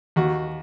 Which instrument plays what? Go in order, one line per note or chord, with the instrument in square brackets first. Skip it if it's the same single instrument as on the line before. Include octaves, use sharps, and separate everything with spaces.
[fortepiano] D#2 F#4